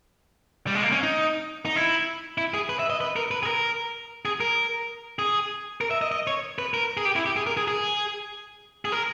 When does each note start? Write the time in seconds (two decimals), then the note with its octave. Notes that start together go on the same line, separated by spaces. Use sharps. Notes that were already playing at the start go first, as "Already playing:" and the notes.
0.67 G3
0.75 G#3
0.83 A#3
0.92 C#4
1.03 D#4
1.65 D#4
1.76 E4
2.38 E4
2.54 G#4
2.69 B4
2.79 E5
2.90 D#5
3.01 B4
3.16 A#4
3.31 B4
3.43 G#4
3.46 A#4
4.25 G#4
4.40 A#4
5.19 G#4
5.81 A#4
5.91 E5
6.02 D#5
6.12 D#5
6.27 C#5
6.58 B4
6.74 A#4
6.97 G#4
7.05 G4
7.16 E4
7.26 G4
7.36 G#4
7.47 A#4
7.57 G#4
7.68 G#4
8.85 G#4
8.92 A#4